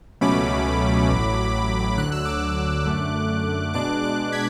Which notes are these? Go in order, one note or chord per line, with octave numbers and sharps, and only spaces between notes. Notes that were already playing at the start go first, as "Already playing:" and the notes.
C#2 B2 F#3 A3 C#4 B5 D6
A1 A2 F#3
D2 D3 F#3 F#6
E6
D6 F#6
F#2 D3 A3
B2 G#3 D4 D6 F#6
D6 F#6
G#6 B6